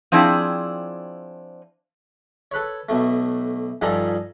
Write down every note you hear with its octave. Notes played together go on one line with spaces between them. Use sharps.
F3 C4 D4 E4 G#4 G5
A4 B4 C#5
B1 A3
G2 F3 G3 D#4 A4 G#5